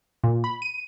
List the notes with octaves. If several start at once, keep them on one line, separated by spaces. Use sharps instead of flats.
A#2
B5
D#7